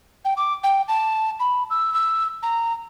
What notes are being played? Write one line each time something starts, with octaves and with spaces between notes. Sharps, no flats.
G5
D6
G5
A5
B5
E6
E6
A#5